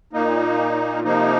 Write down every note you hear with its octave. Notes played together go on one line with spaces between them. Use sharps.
A#2 A#3 D#4
C3 F3 A#3 D#4